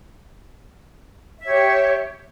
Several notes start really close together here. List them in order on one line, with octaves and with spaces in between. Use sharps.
E5 C#5 G4